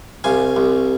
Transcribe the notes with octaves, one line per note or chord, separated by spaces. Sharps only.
C2 F5 G#5
C2